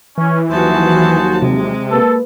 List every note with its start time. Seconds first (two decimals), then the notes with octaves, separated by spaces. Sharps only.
0.18 E3 C#4
0.52 D#2 F3 F#3 F#4 G#4 C5 A5
1.42 C3 G#3
1.91 A#3 A4 B4